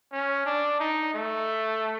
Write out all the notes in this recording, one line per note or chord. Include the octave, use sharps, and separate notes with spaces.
C#4
D4
D#4
A3